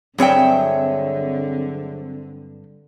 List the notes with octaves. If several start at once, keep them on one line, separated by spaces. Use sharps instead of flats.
G2 D3 F#3 C4 G#4 C#5 E5 G5